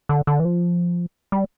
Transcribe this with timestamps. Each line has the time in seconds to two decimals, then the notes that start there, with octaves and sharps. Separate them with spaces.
0.09 D3
0.27 D3
0.40 E3
0.45 F3
1.32 G3